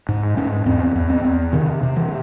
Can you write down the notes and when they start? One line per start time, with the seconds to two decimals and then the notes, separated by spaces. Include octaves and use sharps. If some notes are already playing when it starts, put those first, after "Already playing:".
0.09 G#2
0.37 G#2 C#4
0.66 E2 C4
0.96 E2
1.10 C4
1.24 E2
1.53 C3 D#3
1.83 C3
1.96 E3